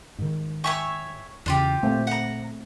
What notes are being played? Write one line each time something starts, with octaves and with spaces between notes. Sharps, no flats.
G#2 D#3
C#5 E5 G5 G#5 C#6
E2 C#3 D4 F4 G4
A#2 A3 C4 C5
F#5 A#5